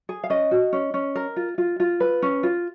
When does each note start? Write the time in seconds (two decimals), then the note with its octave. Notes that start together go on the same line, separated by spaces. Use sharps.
0.09 G#4
0.24 F5
0.30 C#4 D#5
0.51 F#4
0.73 C#4
0.94 C#4
1.15 A#4
1.36 F4
1.58 F4
1.80 F4
2.00 B4
2.22 C#4
2.43 F4